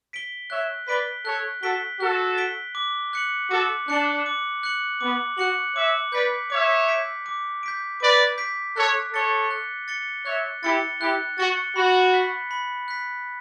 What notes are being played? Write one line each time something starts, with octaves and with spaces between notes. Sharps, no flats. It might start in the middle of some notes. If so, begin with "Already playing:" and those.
B6 D7 G7
C#5 E5 F#6
B4 D5 B6 D7 G7
A4 C#5 F#6
F#4 A4 B6 D7 G7
F#4 A4 F#6
B6 D7 G7
D6
F#6 C#7 F#7
F#4 A4 D6
D4 F#6 C#7 F#7
D6
F#6 C#7 F#7
B3 D6
F#4 F#6 C#7 F#7
C#5 E5 D6
B4 D5 G6 B6 D7
C#5 E5 D6
G6 B6 D7
D6
G6 B6 D7
B4 D5 D6
G6 B6 D7
A4 C#5 F#6
A4 C#5 A6 C#7 G7
F#6
A6 C#7 G7
C#5 E5 F#6
E4 G4 A6 C#7 G7
E4 G4 F#6
F#4 A6 C#7 G7
F#4 B5
F#6 B6
B5
F#6 B6